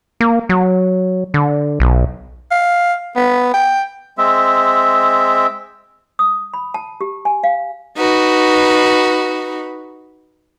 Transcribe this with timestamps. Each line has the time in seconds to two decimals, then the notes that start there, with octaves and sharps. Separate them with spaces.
0.20 A#3
0.49 F#3
1.34 D3
1.80 B1
2.51 F5
3.16 B3
3.54 G5
4.18 G#3 C4 E5
6.19 D#6
6.54 B5
6.74 A5
7.01 G4
7.25 G#5
7.44 F5
7.97 D#4 F#4 B4